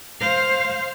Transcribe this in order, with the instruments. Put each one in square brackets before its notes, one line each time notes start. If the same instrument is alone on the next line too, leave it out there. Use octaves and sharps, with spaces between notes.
[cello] C5 F5